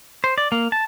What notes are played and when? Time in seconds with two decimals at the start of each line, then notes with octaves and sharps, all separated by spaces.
0.24 C5
0.38 D5
0.52 A#3
0.72 A5